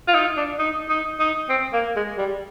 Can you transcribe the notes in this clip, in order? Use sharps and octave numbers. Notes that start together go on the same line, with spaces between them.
F4
D#4
D4
D#4
D#4
D#4
C4
A#3
G#3
G3